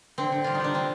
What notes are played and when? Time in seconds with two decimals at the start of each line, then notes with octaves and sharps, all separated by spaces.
0.18 D3 C4
0.32 D3
0.44 G3 F4
0.55 D#4
0.60 G3 D4
0.74 C3 C4